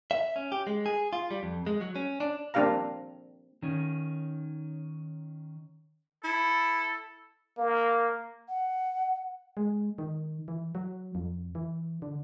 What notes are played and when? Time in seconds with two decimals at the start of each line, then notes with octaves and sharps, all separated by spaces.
0.11 E5
0.36 C#4
0.52 G4
0.67 G#3
0.86 G#4
1.13 F4
1.31 G3
1.43 F2
1.66 G#3
1.81 F#3
1.96 C#4
2.20 D4
2.54 A#3 C4 D4 G4 F5 A#5
3.62 D#3 C#4
6.24 E4 A4
7.58 A#3
8.48 F#5
9.57 G#3
9.98 D#3
10.48 E3
10.75 F#3
11.15 F2
11.55 E3
12.02 D3